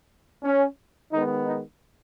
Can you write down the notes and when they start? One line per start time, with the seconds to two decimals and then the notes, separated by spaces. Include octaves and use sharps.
0.43 C#4
1.12 D#3 G#3 B3 D#4
1.47 D#4